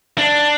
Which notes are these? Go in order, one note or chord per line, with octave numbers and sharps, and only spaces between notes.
D4